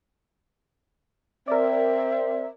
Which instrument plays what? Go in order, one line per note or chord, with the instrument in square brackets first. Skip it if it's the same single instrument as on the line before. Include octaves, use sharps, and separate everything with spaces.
[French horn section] C4 [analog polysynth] A#4 D5 [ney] E5